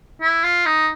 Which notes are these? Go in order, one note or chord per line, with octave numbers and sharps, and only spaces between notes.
E4
F4
D#4